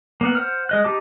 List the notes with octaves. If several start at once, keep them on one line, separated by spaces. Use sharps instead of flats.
A#3 B3 F#5
C5 F#5 F6
G#3 D#5 F#6
D#4 G4 A5 D6